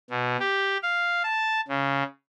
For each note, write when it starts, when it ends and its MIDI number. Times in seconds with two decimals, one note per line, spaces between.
0.10 0.37 47
0.40 0.77 67
0.82 1.22 77
1.24 1.61 81
1.68 2.03 49